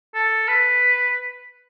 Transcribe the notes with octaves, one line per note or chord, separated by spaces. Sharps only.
A4
B4